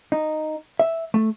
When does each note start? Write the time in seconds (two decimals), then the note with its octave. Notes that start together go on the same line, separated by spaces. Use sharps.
0.12 D#4
0.80 E5
1.14 A3